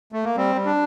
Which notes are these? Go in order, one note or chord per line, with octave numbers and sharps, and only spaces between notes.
A3
A#3
G3 C4
G3
D4